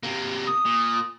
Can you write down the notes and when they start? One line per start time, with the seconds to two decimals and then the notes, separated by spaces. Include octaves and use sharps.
0.03 C3 A#3
0.47 D#6
0.66 A#2